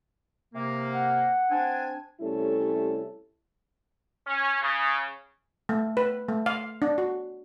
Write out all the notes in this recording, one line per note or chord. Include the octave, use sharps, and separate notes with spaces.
C3 A#3
F#5
C4 D4 G#5
C3 G3 A3 C#4 E4 A4
C#4
C#3
A3
B4
A3
F5
D4
F#4